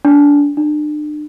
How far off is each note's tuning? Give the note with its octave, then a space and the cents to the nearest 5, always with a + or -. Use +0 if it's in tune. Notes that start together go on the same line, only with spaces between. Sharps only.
D4 -25
D4 +40